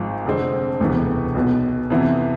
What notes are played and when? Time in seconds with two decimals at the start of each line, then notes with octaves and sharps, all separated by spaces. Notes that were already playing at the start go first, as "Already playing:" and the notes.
Already playing: G#1 G#2 F3
0.25 F1 F2 D3 G#3 C4
0.80 E1 D2 C3 E3 B3
1.35 B1 B2 B3
1.90 F2 C3 E3 B3 E4